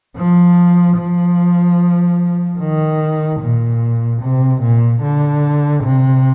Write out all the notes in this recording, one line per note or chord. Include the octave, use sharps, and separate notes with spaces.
F3
F3
D#3
A#2
C3
A#2
D3
C3